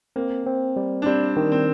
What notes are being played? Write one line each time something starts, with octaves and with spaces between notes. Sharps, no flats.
A#3 C4
C4
G3
D4
G3 C4
D#3
C4